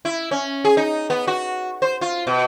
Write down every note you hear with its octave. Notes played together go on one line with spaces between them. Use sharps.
E4
C#4
G#4
D#4
B3
F#4
C5
F4
B2